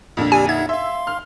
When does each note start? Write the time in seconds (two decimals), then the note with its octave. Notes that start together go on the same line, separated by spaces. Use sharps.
0.17 F2 A#2 D3
0.32 G4 D5 G#5
0.49 D#4 E5 F#5 G#6
0.69 E5 F5 C6
1.07 F6